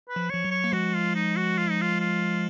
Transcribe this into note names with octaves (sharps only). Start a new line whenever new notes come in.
B4
F3
F3 C#5
F#3
C#5
A#3
F3 G#3 F#4
F4
D#4
F#4
F4
D#4
F4
F4